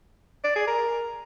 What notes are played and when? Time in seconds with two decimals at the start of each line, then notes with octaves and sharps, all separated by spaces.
0.44 D5
0.56 G#4
0.67 A#4